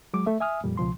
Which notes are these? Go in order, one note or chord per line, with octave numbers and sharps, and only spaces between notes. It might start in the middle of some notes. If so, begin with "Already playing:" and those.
F#3 G#3 D6
A3 E5
E5 G#5 D#6 F6
F2 A#2 G3
C#2 B2 F3 C6